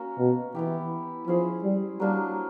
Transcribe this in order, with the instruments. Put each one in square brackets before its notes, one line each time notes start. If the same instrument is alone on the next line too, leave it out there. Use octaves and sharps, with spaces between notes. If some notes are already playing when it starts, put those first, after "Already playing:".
Already playing: [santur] A#3 C#4 F#4
[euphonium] B2
[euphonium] E3 [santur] B3 E4 G4
[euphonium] F3 [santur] C#4 E4 G#4 C5
[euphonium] G3
[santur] F#3 A#3 D4 [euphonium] G3